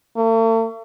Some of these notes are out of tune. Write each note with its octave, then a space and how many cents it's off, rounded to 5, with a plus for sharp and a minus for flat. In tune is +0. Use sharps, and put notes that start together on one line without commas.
A3 +45